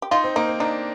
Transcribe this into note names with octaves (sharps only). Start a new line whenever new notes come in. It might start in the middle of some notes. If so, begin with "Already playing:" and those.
G4
D#4 F4
C4
A#3 D#4
C4
D4 D#4